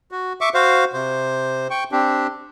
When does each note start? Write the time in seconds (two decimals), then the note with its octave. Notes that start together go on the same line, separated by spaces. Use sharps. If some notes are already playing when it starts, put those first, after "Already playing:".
0.11 F#4
0.41 E5 C#6 D6
0.54 F#4 C5 F5
0.93 C3 C5
1.70 G5 C#6
1.92 C4 D4 G4